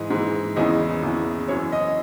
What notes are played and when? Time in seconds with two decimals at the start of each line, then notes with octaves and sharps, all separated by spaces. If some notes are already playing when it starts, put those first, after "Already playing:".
Already playing: G#2 E3 D#5
0.10 G#2 E3
0.56 E2 C#3 E3 D#5
1.03 E2 C#3 E3
1.48 F#2 E3 C#5
1.72 D#5